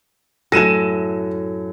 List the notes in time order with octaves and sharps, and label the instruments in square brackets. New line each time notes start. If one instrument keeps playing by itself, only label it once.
[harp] F#2 A2 E4 [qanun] A4 G#5 [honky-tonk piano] A#6 D#7 E7